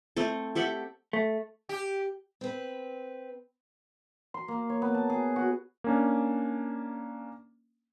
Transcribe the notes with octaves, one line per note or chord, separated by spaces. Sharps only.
A3 C4 A4
G4 A4 E5 F#5
A3
G4
C4 B4
C6
A#3
C#5
B3
A5
G#4
F#4
A#3 C#4 D4